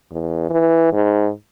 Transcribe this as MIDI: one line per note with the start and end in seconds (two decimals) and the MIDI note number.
0.12 0.48 40
0.50 0.93 52
0.93 1.30 44